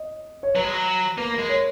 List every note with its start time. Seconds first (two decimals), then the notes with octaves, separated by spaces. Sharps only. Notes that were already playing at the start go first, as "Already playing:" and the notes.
Already playing: D#5
0.43 C#5
0.55 F#3 B4
0.64 G#3
0.73 F#3
1.18 A#3 B4
1.34 A#4
1.39 G#3
1.49 C#5